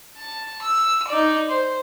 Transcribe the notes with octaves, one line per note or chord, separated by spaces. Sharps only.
A5
E6
D#4 D5
C5